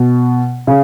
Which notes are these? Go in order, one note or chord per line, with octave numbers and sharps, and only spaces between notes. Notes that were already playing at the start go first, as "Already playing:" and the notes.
Already playing: B2
C#3